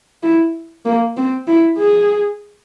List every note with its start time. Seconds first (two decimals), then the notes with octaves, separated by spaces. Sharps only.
0.23 E4
0.85 A#3
1.17 C4
1.48 E4
1.78 G#4